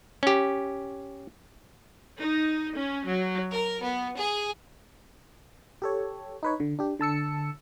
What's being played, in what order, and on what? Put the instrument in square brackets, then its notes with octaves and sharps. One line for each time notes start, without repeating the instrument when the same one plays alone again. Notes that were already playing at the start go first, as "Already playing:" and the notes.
[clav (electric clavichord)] C#4 G4
[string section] D#4
C#4
F#3
A#4
B3
G#4
[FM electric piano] G4 A4 C#5
D#4 B4 C#5
D3
D4 G4
D3 A5 E6 C#7